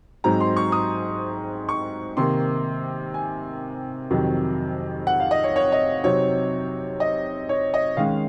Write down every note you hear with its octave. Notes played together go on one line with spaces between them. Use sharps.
G#2 F#3 C4 D#4 A#5
C6
C#6
D#6
C#6
C3 D#3 A#3 C6
G#5
F2 C3 D#3 F#3
F#5
F5
D#5
C#5
C#5
D#5
C3 F#3 C4 D#4 C#5
D#5
C#5
D#5
D#3 G#3 C#4 F5